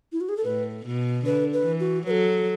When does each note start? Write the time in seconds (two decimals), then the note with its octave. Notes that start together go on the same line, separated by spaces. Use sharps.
0.12 E4
0.20 F#4
0.29 G#4
0.37 A4
0.44 A2 B4
0.86 B2
1.25 D3 B4
1.53 B4
1.65 E3
1.80 F#4
2.06 F#3 A4 B4